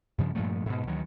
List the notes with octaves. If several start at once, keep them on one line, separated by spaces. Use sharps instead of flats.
G2 C#3 F3
G2 A#2 F3 A3
G#2 B2
D2 D#3 E3 F#3